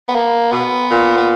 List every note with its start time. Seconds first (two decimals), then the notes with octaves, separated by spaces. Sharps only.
0.09 B3
0.15 A#3
0.52 B2 B3
0.91 A#2
1.17 B3